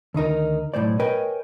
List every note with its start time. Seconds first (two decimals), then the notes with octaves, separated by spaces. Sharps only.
0.14 D2 D#3 D#4 A#4
0.74 B1 A2 G#3 C5 D5
1.00 A#4 B4 C#5 D#5 G5 G#5